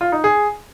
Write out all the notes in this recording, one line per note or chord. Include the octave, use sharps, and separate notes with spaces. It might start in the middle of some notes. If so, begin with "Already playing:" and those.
F4
D#4
G#4